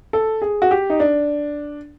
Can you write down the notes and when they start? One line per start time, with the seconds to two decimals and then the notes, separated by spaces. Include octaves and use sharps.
0.13 A4
0.42 G#4
0.62 F#4
0.71 G4
0.90 D#4
1.00 D4